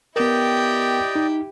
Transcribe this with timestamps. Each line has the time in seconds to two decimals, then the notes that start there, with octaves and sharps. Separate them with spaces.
0.16 B3 E4 G4 A#4 D5 D#5 G5
1.15 D#4